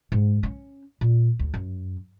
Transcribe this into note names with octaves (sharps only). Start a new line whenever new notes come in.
G#2
C#4
A#2
D2
F#2